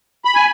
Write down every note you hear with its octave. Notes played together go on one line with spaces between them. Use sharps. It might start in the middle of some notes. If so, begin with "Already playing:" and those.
B5
G#5